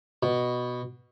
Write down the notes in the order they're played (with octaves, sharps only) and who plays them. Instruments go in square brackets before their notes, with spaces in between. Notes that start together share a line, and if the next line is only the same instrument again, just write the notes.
[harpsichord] B2